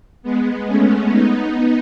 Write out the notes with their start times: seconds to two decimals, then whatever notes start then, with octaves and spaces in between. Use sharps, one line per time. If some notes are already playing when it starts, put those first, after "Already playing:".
0.23 G#3 B3
0.66 A3 C#4
1.10 B3 D#4